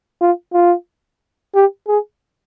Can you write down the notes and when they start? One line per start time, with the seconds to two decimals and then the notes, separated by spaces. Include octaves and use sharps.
0.21 F4
0.53 F4
1.55 G4
1.88 G#4